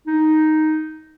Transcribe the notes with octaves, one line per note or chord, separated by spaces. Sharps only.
D#4